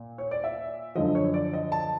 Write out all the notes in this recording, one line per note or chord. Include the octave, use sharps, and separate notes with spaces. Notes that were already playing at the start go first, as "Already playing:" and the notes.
Already playing: A#2
C#5
D5
E5
F#2 D3 F3 D#5
C#5
D5
D#5
A5